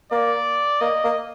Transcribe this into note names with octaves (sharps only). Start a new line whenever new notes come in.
A#3 D5
A#3 D#5
A#3